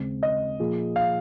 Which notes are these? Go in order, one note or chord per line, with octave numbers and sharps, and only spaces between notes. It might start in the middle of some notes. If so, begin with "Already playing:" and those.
Already playing: D#2 C#3 G#3 C4
D#5
A#2 F3 A#3 F4 G#4
F5